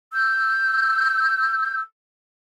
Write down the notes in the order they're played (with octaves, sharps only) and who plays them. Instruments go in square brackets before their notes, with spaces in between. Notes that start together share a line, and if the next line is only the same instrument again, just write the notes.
[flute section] E6 G6